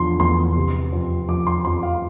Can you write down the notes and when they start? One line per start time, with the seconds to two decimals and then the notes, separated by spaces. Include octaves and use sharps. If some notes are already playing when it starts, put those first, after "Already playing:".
Already playing: E2 D3 F3 C6
0.20 E2 C6
0.56 C3
0.93 F2
1.28 F3 D6
1.47 C6
1.65 F2 C6
1.83 F5